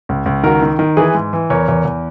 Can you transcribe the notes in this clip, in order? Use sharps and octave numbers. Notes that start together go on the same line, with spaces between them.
C#2
C#2
D#3 F#4 A#4
D#3
D#3
E3 G#4 B4
G#2
E3
E2 A#4 C#5
E2
E2